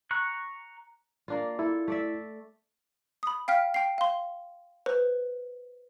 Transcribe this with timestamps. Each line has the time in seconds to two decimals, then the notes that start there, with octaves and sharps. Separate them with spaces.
0.11 A#5 C#6 F#6
1.28 A#3 D4 F4
1.59 E4 A4
1.88 A3 D5 E5
3.23 B5 D#6
3.48 F5 G5 F6 B6
3.74 G5 C7
3.98 F5 C6
4.86 B4 C5